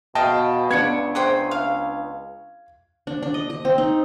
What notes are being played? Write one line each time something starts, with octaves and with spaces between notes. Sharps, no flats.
B2 D#5 F5 G5 A5
C#2 B3 D4 G#6 C#7
C5 G5 D#6
F5
D4
D4
D#5
D#5
C4
D#4